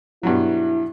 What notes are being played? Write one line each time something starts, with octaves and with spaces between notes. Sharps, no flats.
G2 B2 F#3 E4